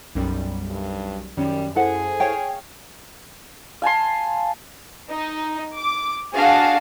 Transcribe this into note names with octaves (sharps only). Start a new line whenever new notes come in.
B1 F#2 G3
G2
F#2 D#3 G3 C#4
E4 G#4 A4 C5 F#5
C#5 F5 G5
F5 G#5 A5 C6
D#4
D6
D4 F#4 G#4 F5 A5